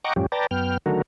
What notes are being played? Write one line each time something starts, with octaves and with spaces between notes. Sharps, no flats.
D#5 F#5 G5 A#5 C#6 D6
F#2 A2 F3 G3 C#4 G4
B4 D5 G5 A5 A#5
F#2 B3 G5 F6
D3 D#3 F#3 A3 F#4 A#4